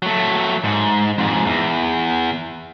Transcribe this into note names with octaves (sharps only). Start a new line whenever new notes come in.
F#3 A3
G#2
F2 G#2
E2